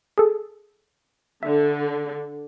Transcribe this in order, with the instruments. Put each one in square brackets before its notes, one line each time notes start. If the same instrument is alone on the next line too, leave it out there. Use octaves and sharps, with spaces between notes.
[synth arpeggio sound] G#4 A4
[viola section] D3 [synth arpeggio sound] E5